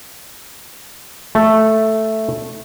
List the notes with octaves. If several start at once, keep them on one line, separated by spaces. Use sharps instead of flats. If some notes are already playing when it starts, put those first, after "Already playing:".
A3